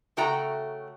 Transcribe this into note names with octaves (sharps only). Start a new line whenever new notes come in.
C#3 A3 F#4 G5 A#5